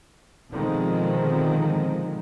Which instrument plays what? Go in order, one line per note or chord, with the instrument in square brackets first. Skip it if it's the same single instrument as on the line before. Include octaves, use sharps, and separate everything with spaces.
[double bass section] B2 D3 D#3 F3 G#3 C4